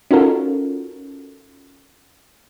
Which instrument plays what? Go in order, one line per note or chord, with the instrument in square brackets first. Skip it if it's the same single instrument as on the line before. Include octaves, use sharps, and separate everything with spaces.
[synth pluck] C#4 D#4 F4 F#4 A4 A#4